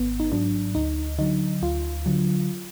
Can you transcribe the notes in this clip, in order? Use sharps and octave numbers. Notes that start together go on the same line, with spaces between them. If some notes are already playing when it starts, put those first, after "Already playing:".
Already playing: G#1 B3
D#4
G#2 F#3 D4
D2 D#4
D3 F#3 D#4
D2 F4
D3 F#3